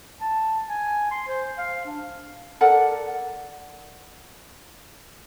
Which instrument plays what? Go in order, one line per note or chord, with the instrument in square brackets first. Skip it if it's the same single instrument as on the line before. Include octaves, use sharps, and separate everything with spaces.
[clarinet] A5
G#5
C6
C5
F5
D4
[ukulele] A4 A#4 D5 F#5